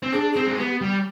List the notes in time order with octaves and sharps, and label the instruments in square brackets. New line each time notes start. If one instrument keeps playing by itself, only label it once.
[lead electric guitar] C4
[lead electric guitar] D4 [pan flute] G#4
[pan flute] G#4
[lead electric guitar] C4
G#3
[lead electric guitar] B3 [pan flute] G4
[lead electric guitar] G3